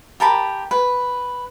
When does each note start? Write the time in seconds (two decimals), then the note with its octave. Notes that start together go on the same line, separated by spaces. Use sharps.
0.20 G4 A#4 A5 B5
0.71 B4